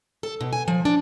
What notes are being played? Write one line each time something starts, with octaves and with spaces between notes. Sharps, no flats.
A4
B2
G#5
F3
D4